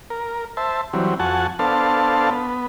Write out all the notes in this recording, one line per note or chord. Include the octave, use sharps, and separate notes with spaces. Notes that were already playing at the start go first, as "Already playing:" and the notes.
A#4
C5 E5 A5
E3 F#3 G3 C4
F2 F#4 F#5 G#5 A5
B3 D4 A4 C5 F5 A5
B3